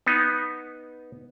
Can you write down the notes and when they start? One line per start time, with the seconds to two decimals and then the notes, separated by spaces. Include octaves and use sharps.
0.07 B3 D#4